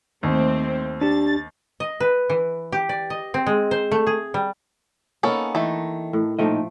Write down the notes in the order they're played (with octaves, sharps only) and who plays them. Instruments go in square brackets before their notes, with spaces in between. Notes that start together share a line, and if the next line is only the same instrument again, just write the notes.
[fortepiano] D#2 [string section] A3 C4 C5
[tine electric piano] D4 G4 [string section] A6
[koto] D#5
B4
E3
G4
D5
D#5
C4
G#3
C5
A3
G#4
G3
[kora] A#3 D#4 [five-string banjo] B3 C#4 A4
[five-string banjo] D#3 A3 [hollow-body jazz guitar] E3
[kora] A2
[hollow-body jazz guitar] A#2 D#4 D#5 [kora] F3 A3 G5